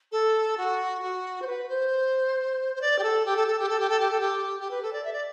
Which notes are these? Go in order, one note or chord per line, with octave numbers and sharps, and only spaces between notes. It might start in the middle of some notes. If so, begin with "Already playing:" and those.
A4
F#4
F#4
C5
B4
C5
C5
D5
G4
A4
G4
A4
A4
G4
A4
G4
A4
G4
A4
G4
G4
B4
A4
D5
E5
D5